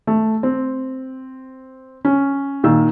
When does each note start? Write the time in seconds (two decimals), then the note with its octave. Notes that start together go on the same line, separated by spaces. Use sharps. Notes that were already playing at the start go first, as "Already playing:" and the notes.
0.07 A3
0.43 C4
2.05 C#4
2.64 A#2 D#3 E6